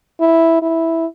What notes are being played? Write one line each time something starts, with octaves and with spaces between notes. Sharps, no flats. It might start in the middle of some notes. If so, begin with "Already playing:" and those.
E4
E4